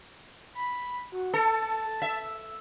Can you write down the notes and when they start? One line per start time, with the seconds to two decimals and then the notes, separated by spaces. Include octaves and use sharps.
0.55 B5
1.12 F#4
1.34 A4 A5
2.02 E5